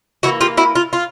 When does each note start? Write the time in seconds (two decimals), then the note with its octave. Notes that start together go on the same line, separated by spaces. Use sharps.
0.23 E3 G3 A#3 E4 F#4
0.41 F4 G4
0.57 E4 F#4
0.75 F4
0.93 F4